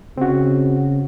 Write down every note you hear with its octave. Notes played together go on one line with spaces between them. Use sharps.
C#3 C4 F#4